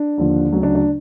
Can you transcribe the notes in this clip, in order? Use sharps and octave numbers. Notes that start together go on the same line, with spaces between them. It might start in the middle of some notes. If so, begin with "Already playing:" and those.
Already playing: D4
D#2 D3 F3
D2 C#3 F#3
D4
D4